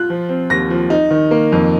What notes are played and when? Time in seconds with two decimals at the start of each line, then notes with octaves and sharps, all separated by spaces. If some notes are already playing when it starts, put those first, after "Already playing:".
Already playing: F4 F#6
0.10 F3
0.29 C4
0.50 D#2 A#6
0.70 F3
0.90 D#4
1.11 D#3
1.31 A#3
1.52 F2